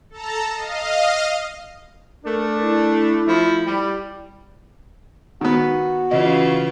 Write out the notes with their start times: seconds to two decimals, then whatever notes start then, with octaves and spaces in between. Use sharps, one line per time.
0.10 A4 A5 A#5
0.54 D#5 F5
2.24 A3 D4 A#4
2.62 E4
3.26 F3 A3 B5
3.66 G3
5.41 D#3 B3 F#4
6.11 C#3 E3 F4 D#5